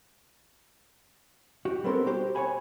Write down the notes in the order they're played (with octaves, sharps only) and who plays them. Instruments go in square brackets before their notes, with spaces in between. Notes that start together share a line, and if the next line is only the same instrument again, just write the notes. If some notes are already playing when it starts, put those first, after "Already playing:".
[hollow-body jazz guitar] F#4 G4
G3 B3 C4 A4 A#4 C6
F#4 G4 C5
C#5 D#5 F#5 G#5 B5